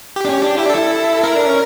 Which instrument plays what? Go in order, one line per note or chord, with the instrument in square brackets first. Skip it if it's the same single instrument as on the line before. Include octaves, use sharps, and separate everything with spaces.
[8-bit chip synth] G4
[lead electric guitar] D4
C#4
D4
[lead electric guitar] E4 [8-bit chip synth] G4
[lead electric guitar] D4 [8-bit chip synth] A4
[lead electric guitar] E4
[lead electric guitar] E4 [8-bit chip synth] A#4
[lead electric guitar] D4
C#4